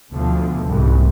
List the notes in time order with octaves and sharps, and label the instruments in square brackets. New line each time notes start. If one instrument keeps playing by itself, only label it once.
[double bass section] D2 B2 D3 F3
C2 G#2